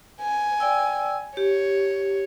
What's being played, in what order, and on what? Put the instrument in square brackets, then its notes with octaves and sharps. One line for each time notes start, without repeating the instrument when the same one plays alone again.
[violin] G#5
[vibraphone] D5 G5 E6
[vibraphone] G4 [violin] C#5